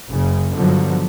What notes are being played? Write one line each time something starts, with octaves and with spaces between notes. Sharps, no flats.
F#1 C#3
G2 B2 D3 F3 F#3